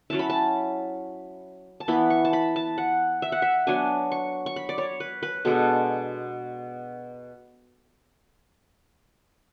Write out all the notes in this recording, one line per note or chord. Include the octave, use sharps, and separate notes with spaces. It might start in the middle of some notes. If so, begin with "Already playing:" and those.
F#3 C#4 E4 A5
B5
A5
A5
E3 B3 E4 B5
C#6
A5
B5
A5
F#5
E5
F#5
E5
F#3 B3 D4 G#5
C#6
C#6
B5
D5
C#5
B4
B4
B2 G#3 D4 A4